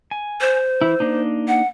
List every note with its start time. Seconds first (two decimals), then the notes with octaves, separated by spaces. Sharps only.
0.11 G#5
0.41 C5
0.81 E3 E4
1.00 A#3 D4 D#4
1.48 F#5